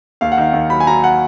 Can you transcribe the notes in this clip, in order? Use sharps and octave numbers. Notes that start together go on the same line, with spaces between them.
D#2 F5
F#5
D#3 F5
D#2
F#3 B5
G#5
F#3 A#5
F#5